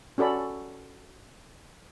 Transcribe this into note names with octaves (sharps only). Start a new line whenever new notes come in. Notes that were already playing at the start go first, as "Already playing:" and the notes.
C#4 F#4 A4 D5 B5